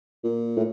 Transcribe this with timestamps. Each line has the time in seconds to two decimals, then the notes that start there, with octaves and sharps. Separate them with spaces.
0.24 A#2
0.57 A2